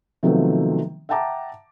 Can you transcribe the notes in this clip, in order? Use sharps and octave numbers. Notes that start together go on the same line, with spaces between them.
C3 D#3 F3 F#3 A3 B3
E5 F#5 G5 A5 A#5 D6